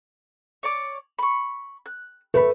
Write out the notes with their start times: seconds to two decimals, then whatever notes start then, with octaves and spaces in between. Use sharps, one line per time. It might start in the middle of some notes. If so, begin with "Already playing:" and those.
0.63 C#5 D5 D6
1.19 B5 C#6
1.86 F#6
2.34 A3 B4 F#5 B5